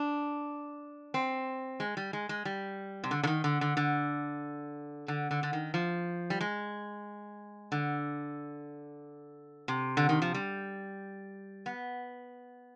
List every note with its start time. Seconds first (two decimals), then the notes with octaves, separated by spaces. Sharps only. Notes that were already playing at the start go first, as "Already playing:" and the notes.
Already playing: D4
1.14 C4
1.80 G#3
1.97 G3
2.13 G#3
2.29 G#3
2.45 G3
3.04 C3
3.11 D3
3.23 D3
3.27 D#3
3.44 D3
3.61 D3
3.77 D3
5.08 D3
5.31 D3
5.43 D3
5.53 D#3
5.74 F3
6.30 G3
6.41 G#3
7.72 D3
9.68 C3
9.97 D3
10.09 D#3
10.22 F3
10.34 G3
11.66 B3